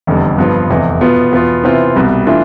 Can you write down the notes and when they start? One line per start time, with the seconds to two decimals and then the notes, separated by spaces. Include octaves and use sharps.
0.07 F1 E2 D3 G3
0.38 G2 F3 B3 F4
0.69 F1 E2 C3
1.01 B2 B3 F4
1.33 E2 B2 B3 F4
1.64 C3 E3 B3 F4 C5
1.96 C2 B2 G3
2.27 E3 A3 D4 F4